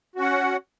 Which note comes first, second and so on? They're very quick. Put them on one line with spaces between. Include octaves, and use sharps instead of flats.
F#4 C#4 F#5